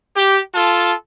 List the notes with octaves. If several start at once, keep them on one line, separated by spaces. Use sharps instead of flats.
G4
F4 A4 A5